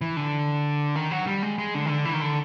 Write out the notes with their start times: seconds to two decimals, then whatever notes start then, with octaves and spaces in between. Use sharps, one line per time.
0.01 E3
0.17 D3
0.96 D#3
1.11 F#3
1.27 G3
1.42 G#3
1.58 G#3
1.75 D3
1.85 D#3
1.89 D3
2.05 E3
2.14 D#3
2.21 D3